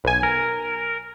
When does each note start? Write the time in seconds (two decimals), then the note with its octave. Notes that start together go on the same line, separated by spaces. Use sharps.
0.04 B1 G#5
0.23 A#4